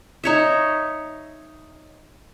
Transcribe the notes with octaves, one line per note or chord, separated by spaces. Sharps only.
D#4 C#5 E5